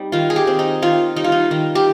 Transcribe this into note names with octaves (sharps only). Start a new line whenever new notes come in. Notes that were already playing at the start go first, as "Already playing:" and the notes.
Already playing: G3 C4 D#4
D#3 F4
G#4
G4
C4
D#4
D#3 F4
G3 D#4
F4
D#4
D#3
G4